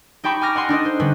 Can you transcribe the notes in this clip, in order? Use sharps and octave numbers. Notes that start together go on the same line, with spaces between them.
D#4 G4 G5 A5 B5 C#6
G#5 D6 F6 A#6
D#5 F#5 G#5 C6
D4 D#4 A4 D#5
C5
D3 G3 B3 C#4 B4